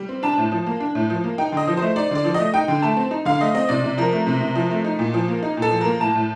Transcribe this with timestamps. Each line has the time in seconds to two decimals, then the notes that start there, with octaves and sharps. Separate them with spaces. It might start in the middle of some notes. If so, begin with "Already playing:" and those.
Already playing: G3
0.09 C4
0.23 D4 A5
0.38 A2
0.52 F3
0.66 A#3
0.80 D4
0.95 A2
1.10 F3
1.24 A#3
1.38 D#4 G5
1.52 D3 D#5
1.68 F3
1.77 A3 C5
1.96 D#4 D5
2.11 D3 D5
2.24 F3
2.34 A3 D#5
2.54 D#4 G5
2.68 D3
2.82 A3 A5
2.97 C4
3.11 D#4
3.25 D3 F5
3.41 A3 D#5
3.54 C4 D#5
3.69 C3 D5
3.84 C3
3.98 F3 A#4
4.12 A3
4.27 C3
4.41 C3
4.55 F3
4.71 A3
4.84 D#4
4.99 A#2
5.14 F3
5.28 A#3
5.43 D#4
5.57 A#2
5.62 A4
5.71 F3
5.81 A#3 A#4
6.00 A2 A5
6.15 A2